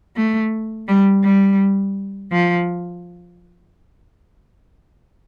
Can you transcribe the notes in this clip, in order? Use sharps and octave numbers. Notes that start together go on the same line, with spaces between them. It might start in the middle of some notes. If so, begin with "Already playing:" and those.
A3
G3
G3
F3